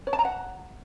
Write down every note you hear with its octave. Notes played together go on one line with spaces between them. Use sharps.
C#5
A5
A#5
F#5